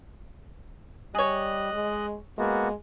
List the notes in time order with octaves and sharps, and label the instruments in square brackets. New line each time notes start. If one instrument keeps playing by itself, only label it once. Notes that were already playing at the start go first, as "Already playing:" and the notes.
[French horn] G3 [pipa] G#4 C#5 [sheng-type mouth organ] D#5 F#6
[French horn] G#3
[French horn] G#3 [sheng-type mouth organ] A#3 B3 F#4